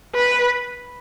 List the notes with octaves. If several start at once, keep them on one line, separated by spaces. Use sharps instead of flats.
B4